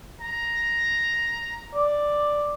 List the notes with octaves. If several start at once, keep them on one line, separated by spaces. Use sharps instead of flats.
A#5
D5